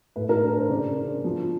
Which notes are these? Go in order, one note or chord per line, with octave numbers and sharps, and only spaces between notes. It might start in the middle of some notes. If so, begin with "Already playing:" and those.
A2 B4
A#4
D4 B4
C5
C#3 D5
D4
F3